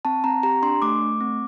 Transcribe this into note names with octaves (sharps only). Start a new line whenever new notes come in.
C4 A5
C4 A#5
G4 A#5
D4 C6
A3 D6
A3
C4